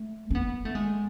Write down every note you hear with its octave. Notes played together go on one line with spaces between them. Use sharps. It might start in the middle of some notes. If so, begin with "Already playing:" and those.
Already playing: A3
C#4
B3
A3
G#3